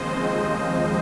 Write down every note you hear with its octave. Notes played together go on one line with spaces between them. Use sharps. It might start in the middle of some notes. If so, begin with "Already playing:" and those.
Already playing: D#2 C#3 F3 G#3 C4 C5 D#5